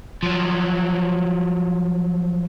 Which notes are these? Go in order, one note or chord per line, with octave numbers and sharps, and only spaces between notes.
F3 F#3